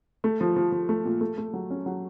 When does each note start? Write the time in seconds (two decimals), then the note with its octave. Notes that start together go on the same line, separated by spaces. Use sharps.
0.24 A3
0.41 F3
0.56 F3
0.72 F3
0.89 A3
1.05 A#2
1.21 A3
1.38 A3
1.53 F#3
1.70 C#4
1.86 F#3